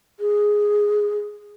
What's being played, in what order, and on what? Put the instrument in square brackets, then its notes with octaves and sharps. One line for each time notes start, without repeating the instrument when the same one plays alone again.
[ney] G#4